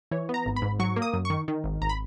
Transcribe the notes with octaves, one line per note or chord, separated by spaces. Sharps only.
E3 C#5
B3
A#5
G#1
B5
G#2
F#3 C#6
A#3
D#6
F#2
C#6
D#3
D#3
G#1
G#1 A#5
B5